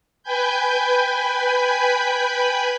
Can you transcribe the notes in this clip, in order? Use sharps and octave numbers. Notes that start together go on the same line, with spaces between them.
B4 G5 G#5 B5 G6